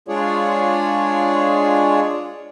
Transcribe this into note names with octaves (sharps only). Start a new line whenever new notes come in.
G#3 D4 F4 G#4 C#5 D5